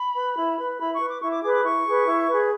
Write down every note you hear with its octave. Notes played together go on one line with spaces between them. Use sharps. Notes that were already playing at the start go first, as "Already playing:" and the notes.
Already playing: B5
B4
E4
B4
E4 B5
C#6
B4
D6
E4 C#6
D6
G#4 B4 D6
D6
E4 C#6
G#4 B4
E4
G#4 B4